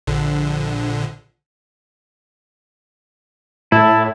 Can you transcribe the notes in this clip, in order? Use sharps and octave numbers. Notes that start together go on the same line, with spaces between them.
A#1 D3
A2 E4 A5